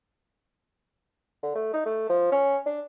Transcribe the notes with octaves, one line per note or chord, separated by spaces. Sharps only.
D3
A3
D#4
A3
F3
C#4
D4